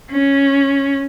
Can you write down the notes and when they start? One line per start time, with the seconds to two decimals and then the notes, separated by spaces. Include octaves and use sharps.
0.11 C#4